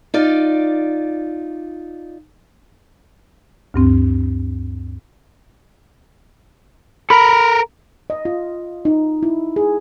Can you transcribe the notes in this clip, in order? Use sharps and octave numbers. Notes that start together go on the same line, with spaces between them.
D#4 F4 D5
D2 G2 C4
A4 A#4 A#5 B5
D#5
F4
D#4
E4
G#4